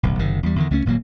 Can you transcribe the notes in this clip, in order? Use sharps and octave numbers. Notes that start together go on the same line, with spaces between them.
D1 B1
F#1 C3 D#3
E2 G3
E2 D3 D#3
C#2 A3 A#3 C#4
D#1 A#2 F#3 A#3